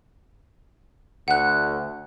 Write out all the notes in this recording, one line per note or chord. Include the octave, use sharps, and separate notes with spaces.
D2 F#5 F#6